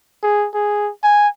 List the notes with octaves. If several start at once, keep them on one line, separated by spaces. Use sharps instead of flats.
G#4
G#4
G#5